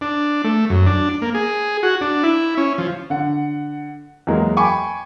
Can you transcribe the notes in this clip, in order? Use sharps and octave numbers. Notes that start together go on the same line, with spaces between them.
D4
A3
F#2
D4
A#3
G#4
F#4
D4
E4
C#4
F3
D3 F#5
E2 F#3 G#3 A#3
G5 G#5 B5 C#6 D6